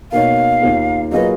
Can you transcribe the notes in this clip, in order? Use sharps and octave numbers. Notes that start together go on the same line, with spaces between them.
B2 A#3 D#4 A#4 C#5 F5
D#2 D#3 A#3 F4
F#3 A#3 F4 G#4 B4 D#5